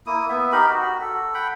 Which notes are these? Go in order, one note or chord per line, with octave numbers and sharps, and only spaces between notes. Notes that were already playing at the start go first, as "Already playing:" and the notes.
A#3 E4 D#6
B3 E5
D#4 G4 A#4 B5
F#4
A4
F#5 G5 B5